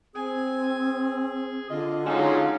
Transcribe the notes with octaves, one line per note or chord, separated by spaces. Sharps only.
C4 G#4 G#5
D3 F4 D#5
F#3 G#3 C#4 D#4 F4